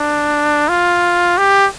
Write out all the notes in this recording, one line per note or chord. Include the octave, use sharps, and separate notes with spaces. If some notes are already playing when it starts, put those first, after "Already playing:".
Already playing: D4
F4
G4